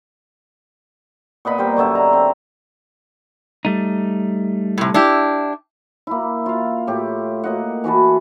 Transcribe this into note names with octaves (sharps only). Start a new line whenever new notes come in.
A#2 B3 D#5 B5
G3 A#4 C5
F#2 B2 D3 E5
A#5
C4
G3 A3 D#4
A2 C3
D4 E4 G4
A#3 E4
F4 F5
A2 G4
A#3 D#5 F#5
E3 F#4 B4 A5